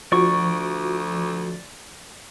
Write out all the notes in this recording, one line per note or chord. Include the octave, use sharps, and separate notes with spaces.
D2 F3 F#4 D5 C#6